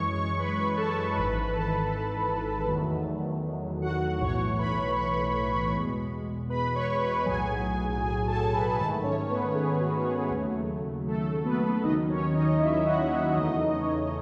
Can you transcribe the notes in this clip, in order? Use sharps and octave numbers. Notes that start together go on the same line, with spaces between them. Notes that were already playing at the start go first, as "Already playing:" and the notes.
Already playing: F#2 E3 G#3 C#5 C#6
C#5 C#6
B4 B5
A4 A5
G#1 G#2 E3 B4 B5
A4 A5
E2 D#3 F#3 A3
F#4 F#5
B1 A2 E3 A3 C#5 C#6
B4 B5
C#5 C#6
E2 B2 G#3
B4 B5
C#5 C#6
B4 B5
B1 A2 F#3 G#4 G#5
G#4 G#5
A4 A5
B4 B5
G#2 D#3 A3 A4 A5
C#4 C#5
B3 B4
G#4
F#4
G#4
D#2 C#3 F#3 A3
A3 A4
B3 B4
D#2 D#3 F#3 D#4 D#5
C#4 C#5
D#4 D#5
E4 E5
F#4 F#5
E4 E5
E2 C#3 E3 A3 D#4 D#5
C#4 C#5